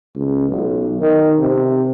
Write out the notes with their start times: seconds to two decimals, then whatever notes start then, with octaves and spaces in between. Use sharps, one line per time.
0.16 C#2
0.48 B1
1.00 D#3
1.39 C3